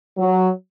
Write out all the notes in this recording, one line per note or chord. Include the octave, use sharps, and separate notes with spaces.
F#3